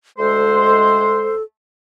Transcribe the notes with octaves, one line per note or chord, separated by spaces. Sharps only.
D2 G#3 A4 C5